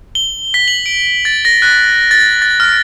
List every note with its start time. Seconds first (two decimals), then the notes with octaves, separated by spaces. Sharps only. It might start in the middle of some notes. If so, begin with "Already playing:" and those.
0.15 G7
0.54 B6
0.68 F#7
0.86 D7
1.25 A6
1.45 A#6
1.62 F#6
2.11 A6
2.42 A6
2.60 F6